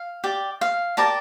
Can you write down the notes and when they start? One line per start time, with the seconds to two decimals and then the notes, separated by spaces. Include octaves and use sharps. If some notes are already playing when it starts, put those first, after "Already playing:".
Already playing: F5
0.24 G4 D5
0.61 F5
0.97 G4 A#4 D5 A5